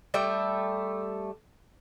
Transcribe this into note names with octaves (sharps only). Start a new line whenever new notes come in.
G3 A3 E5 G5